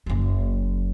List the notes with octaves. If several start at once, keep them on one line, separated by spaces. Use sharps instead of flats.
F#1 F#3